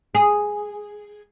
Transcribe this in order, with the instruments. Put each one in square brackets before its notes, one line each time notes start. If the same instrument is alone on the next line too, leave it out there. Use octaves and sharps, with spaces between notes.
[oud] G#4